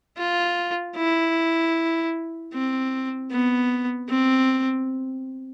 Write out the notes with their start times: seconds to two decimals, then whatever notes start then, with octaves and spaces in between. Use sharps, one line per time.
0.17 F4
0.96 E4
2.53 C4
3.31 B3
4.09 C4